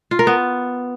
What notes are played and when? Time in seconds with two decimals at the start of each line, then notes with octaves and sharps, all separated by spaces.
0.11 F4
0.19 A#4
0.27 B3